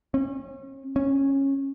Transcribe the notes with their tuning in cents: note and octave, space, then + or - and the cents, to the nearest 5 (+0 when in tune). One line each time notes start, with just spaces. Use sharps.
C#4 -40
C#4 -15